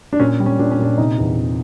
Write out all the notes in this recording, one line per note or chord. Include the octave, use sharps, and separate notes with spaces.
D4
A#2 C#4
G3
C#4
A#2 D4
C#4
A#2 D4
C3 D#4
E2
C3